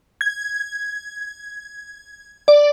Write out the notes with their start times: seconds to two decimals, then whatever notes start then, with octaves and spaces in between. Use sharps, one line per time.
0.21 G#6
2.48 D5